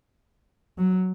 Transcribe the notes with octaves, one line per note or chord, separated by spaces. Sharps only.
F#3